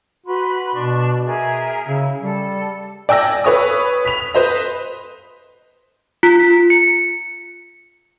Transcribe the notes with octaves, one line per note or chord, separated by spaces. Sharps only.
F#4 B4 B5 C6
B2 D4 C#6
G#4 A#4 E5
C#3 E4
G3 A4
D5 G5 G#5 E6 A#6
B4 C#5 D#6
B6 F7
B4 C5 D#5
F4
C#7